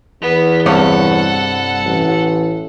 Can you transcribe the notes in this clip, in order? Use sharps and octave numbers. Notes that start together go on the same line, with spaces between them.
E2 B3
C2 G2 A4 C#5 F#5
A1